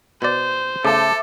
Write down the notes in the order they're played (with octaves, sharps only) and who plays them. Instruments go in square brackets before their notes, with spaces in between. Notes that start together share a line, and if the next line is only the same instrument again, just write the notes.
[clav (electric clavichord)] B2 D5 [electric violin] C5
[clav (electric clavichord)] C#3 A3 [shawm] A4 [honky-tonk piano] E5 A5 D6